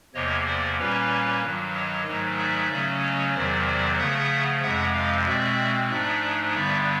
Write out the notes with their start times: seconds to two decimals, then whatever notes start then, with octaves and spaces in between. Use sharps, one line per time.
0.14 E2 C3 F3 A#3 C#5 D#5
0.46 C5 D5
0.78 A#2 G3 A#3 C#4 B4 C#5
1.42 G2 D#3 F#3
1.75 C#5 D#5
2.06 G#2 D#3 F#3 A3
2.39 D5 E5
2.70 C#3 F#3 A3 C#4
3.02 C#5 D#5
3.34 E2 C3 D#3 F#3 C5 D5
3.66 C5 D5
3.98 C#3 F3 A3 E5 F#5
4.62 F2 C3 F3 G#3 E5 F#5
4.94 D#5 F5
5.26 B2 G#3 C4 D5 E5
5.90 G#2 F3 A3 D4 D5 E5
6.54 G2 D3 G3 B3 D5 E5